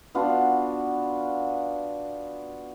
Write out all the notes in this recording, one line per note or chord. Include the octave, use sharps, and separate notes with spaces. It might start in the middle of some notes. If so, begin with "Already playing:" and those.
B3 D4 F4 F#4